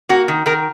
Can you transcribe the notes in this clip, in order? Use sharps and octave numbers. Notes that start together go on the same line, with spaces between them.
A#3 F#4
D#3
D#3 A#4